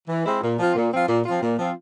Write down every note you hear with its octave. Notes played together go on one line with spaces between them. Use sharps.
E3
G#3 C4 E4
A#2
F3 C4 F4
A#2
F3 C4 F4
A#2
F3 C4 F4
A#2
F3 C4 F4